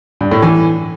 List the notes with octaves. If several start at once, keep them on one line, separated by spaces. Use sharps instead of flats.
G2
A2
E3